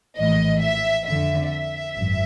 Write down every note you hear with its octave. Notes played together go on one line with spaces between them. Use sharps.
A#1 A2 E3 D#5
E5
F2 D3 E5
E5
G#1 F#2